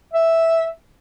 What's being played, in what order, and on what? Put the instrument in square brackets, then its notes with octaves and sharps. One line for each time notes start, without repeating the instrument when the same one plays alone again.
[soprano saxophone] E5